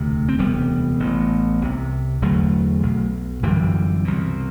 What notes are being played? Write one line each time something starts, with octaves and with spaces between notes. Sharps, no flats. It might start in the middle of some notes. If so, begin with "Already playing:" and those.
Already playing: E1 D2 C3
C4
E1 D2 C3 G3 B3
A1 A2
C2 C3
E1 E2 D3 F#3 A3
B1 B2
G1 F#2 D3 E3 G3
C2 B2